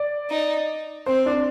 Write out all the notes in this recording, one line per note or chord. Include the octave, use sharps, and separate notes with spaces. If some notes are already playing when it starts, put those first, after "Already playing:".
Already playing: D5
D#4
C4 C5
D4